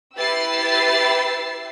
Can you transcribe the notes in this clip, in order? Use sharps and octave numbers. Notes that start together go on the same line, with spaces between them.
E4 G4 B4 E6 A6 C7